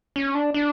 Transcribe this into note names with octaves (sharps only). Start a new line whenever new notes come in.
C#4
D4
D4